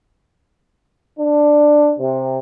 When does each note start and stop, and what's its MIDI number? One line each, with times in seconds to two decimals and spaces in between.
1.19 1.94 62
1.98 2.37 48